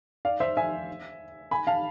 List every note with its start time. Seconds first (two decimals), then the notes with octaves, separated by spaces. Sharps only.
0.25 D5 F5
0.40 C5 E5
0.57 E5 G#5
1.51 G#5 B5
1.67 F5 A5